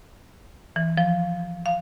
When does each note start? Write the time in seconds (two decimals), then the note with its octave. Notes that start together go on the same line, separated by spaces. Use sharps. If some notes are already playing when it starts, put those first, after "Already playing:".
0.76 E3
0.97 F3
1.66 F5